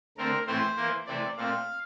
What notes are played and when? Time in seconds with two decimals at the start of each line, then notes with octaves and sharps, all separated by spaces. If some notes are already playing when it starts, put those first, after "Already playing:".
0.18 D3 A3 C4 A#4
0.47 A2 E3 A3 C4 C5
0.76 E3 A#3
1.06 C3 E3 A3 C4 D5
1.36 A#2 A3 C4 F5